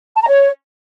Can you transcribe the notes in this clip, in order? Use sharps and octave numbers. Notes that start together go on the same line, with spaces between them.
A5
A#5
C#5